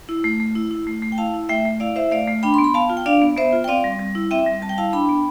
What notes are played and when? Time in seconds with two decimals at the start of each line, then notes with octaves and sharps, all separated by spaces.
0.09 E4
0.24 A3
0.40 A3
0.55 E4
0.71 E4
0.87 A3
1.02 A3
1.12 G5
1.18 E4 F5 A5
1.34 E4
1.49 A3 E5 G5
1.66 A3
1.80 E4 D5 F5
1.96 E4 C5 E5
2.11 A3 D5 F5
2.27 A3
2.43 D4 G5 B5
2.54 B3 C6
2.64 B5
2.74 B3 F5 A5
2.90 F4
2.97 G5
3.06 D4 D5 F5
3.22 B3
3.37 B3 C5 E5
3.53 F4
3.64 G5
3.68 C4 D5 F5
3.84 G3
3.99 G3
4.15 E4
4.31 C4 E5 G5
4.47 G3
4.62 G3 A5
4.69 G5
4.78 E4 F5 A5
4.93 D4 G5 B5
5.09 B3